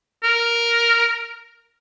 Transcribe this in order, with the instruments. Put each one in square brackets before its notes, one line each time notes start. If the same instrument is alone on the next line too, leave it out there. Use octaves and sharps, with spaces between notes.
[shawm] A#4